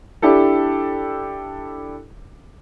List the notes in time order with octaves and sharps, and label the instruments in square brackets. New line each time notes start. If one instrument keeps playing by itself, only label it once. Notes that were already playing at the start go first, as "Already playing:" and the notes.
[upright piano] D4 E4 G4 A4